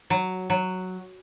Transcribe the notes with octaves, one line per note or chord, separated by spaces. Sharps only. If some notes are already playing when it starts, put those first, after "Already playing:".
F#3
F#3